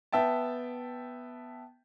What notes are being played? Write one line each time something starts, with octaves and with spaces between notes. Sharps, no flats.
B3 E5 G5 A5